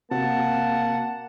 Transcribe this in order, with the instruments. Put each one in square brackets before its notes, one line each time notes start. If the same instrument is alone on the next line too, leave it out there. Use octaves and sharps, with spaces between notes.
[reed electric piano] C3 C4 F#4 [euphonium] A#3 [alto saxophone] F#5 [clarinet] A5